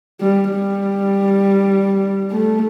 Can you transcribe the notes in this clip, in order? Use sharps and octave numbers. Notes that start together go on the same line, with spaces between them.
G3
G3
A3